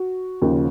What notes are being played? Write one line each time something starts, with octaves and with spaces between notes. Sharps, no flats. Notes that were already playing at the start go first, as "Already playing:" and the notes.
Already playing: F#4
D#2 C#3 F3